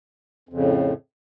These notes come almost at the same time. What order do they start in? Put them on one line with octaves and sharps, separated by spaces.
F2 C#3 A2